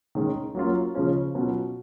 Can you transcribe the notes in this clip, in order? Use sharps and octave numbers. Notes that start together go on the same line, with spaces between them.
D#3 G#3 C#4
F#3 A#3 C#4 F4
C#3 F3 G#3 C#4 F4
B2 F#3 C#4 F4